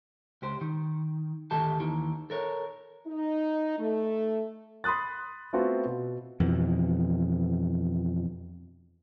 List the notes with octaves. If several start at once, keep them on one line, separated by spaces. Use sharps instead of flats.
C#2 G4 C5
D#3
D2 D#3 G4 A4 A5
D#2 D#3 E3
A4 A#4 C#5
D#4
A3
B5 C6 D#6 F#6 A6
A3 B3 C4 F4 F#4
B2
F2 B2 E3